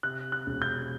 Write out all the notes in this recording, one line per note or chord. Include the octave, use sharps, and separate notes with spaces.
C3 F#6
F#6
E1
G6